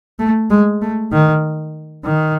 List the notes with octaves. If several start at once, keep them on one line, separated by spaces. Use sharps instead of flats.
A3
G#3
A3
D#3
D#3